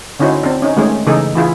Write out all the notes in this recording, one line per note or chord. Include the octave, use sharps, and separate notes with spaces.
D3 C#4 D#4 E4 F#4 C5
C4 D4
C#4 D#4
D#3 G#3 A3 C#4 G#4 C5
C#3 E3 D#4 G#4 A4
E3 E4 F4 G#4